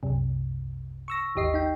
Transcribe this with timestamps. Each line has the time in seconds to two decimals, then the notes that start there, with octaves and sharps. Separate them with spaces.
0.03 C2 F#2 C3
1.08 C#6 E6 A#6
1.35 G#1 D#2 G4 D#5 C7
1.54 D#4 G5